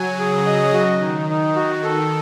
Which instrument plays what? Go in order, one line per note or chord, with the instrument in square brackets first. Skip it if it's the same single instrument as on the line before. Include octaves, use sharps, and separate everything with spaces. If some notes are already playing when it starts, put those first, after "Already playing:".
Already playing: [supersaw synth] C#3 F#3 [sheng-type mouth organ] G#5
[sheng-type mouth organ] G#4
D#5
[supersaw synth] D#3 [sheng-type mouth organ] F#4
[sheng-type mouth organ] D#4
[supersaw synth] D#3
[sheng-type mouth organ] D#4
[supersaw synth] D#3 [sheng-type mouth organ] F#4
[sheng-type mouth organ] A4